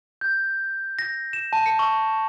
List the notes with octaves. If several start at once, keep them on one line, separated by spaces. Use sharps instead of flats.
G6
A#6
E7
A5
C#7
C#6